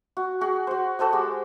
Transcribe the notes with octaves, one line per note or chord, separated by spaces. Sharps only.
F#4
F#4 G#4
F#4 C5
F#4 A4 C5 D#5
G#3 G4